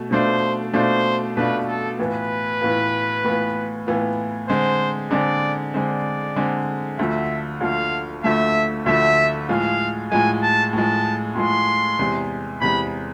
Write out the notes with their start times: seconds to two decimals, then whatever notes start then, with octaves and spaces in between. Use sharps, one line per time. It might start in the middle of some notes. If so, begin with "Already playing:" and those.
Already playing: B2 A3
0.11 B2 A3 D4 F4 C5
0.73 B2 A3 D4 F4 C5
1.36 B2 A3 D4 F4 B4
1.68 A4
1.99 A2 E3 B3 F4 B4
2.61 A2 E3 B3 F4
3.24 A2 E3 B3 F4
3.87 A2 E3 B3 F4
4.48 D3 G#3 C4 C5
5.11 D3 G#3 C4 D5
5.74 D3 G#3 C4 D5
6.36 D3 G#3 C4
6.98 D2 D3 F3 A3 E5
7.61 D2 D3 F3 A3 F5
8.24 D2 D3 F3 A3 E5
8.86 D2 D3 F3 A3 E5
9.49 A2 F3 G#3 F5
10.11 A2 F3 G#3 G#5
10.42 A5
10.73 A2 F3 G#3 A5
11.35 A2 F3 G#3 C6
11.99 E2 C3 G#3
12.61 E2 C3 G#3 B5